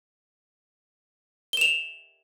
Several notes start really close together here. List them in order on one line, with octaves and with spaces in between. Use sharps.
G7 E7 F7